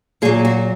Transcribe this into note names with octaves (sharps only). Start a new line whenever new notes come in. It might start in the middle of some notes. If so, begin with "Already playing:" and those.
A#2 F#3 G#4
F#4